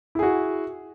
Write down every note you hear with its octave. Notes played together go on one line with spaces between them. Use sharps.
E4 F#4 G#4